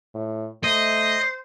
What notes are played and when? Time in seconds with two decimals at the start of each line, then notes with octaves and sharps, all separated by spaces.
0.15 A2
0.64 A3 C5 D#5